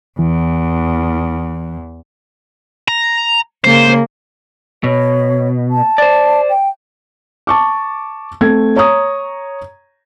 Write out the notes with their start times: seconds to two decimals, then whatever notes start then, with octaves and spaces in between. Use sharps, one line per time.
0.19 E2 E3
2.88 A#5
3.64 C#3 A#3 C5
4.84 B2 C#5
5.70 A5
5.98 C5 D5
6.50 G5
7.47 A5 C#6 D6
8.41 A3 C4 G#6
8.76 C#5 A#5 C#6 D#6